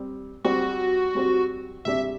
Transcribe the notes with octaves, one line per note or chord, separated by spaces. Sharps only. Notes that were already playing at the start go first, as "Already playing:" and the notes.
Already playing: G3 C4
G3 C4 F#4 G4 C5
G3 C4 G4 C5
C3 G3 D4 G4 D5 E5